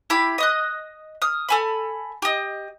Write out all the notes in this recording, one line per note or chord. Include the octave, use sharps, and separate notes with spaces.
E4 G4 B5
D#5 D#6 F#6
D#6 F6
A4 G#5 B5
G4 D#5